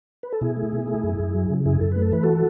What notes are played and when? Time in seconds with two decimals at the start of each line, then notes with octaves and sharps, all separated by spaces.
0.23 B4
0.32 A4
0.41 B2 E4 G#4
0.57 A3
0.73 B2
0.88 A3
1.03 F#2
1.19 F#2
1.34 F#3
1.50 C#3
1.65 F#2 E4 G#4
1.81 F#2 A4
1.92 A3 B4
2.02 A4
2.12 E3 B4
2.23 F#4 A4